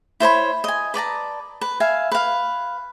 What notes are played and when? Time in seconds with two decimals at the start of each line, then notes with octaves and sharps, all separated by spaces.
0.20 E4 C5 C#5 B5
0.64 D#5 G#5
0.94 B4 D5 A5 A#5
1.61 B4
1.80 E5 F5 G#5
2.11 B4 F5